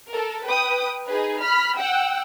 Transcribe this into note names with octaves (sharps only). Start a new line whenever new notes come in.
A4 A#4
B4 G5 D#6
D#4 G#4 B4
B5 F6 B6
F#5 G5 E6